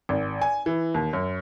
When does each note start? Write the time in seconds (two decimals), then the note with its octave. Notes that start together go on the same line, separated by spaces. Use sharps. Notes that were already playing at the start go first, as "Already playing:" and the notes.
0.09 G#1
0.42 G#5
0.66 E3
0.94 D#2
1.13 F#2